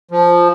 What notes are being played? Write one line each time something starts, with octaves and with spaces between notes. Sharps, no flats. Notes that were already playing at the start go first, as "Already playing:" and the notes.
F3